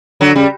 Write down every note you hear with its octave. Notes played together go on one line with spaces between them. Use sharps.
D3 F#3
C#3 G3